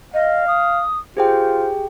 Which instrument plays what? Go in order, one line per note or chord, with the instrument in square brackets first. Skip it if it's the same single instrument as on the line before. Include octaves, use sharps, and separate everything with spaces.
[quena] D#5 [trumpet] F5
[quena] D#6
[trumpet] F4 [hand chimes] G4 G#4 G5 [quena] C5